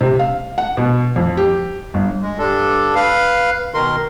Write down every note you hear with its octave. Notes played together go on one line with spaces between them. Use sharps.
C3
F5
F#5
B2
F2
G4
G1
G#3
G2 D4 A4
B4 F5
B2 D#3 A#4 C6